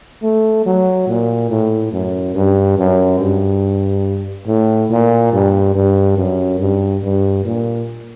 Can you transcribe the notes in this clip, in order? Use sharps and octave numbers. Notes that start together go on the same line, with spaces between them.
A3
F#3
A#2
A2
F#2
G2
F#2
G2
A2
A#2
G2
G2
F#2
G2
G2
A#2